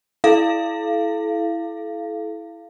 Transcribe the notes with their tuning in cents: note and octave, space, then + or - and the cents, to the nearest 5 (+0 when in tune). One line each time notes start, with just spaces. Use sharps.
E4 +0 A4 -35 F5 -20